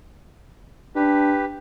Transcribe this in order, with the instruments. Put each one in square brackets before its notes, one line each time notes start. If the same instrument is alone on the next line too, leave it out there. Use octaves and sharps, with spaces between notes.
[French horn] D4 [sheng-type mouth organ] G4 B4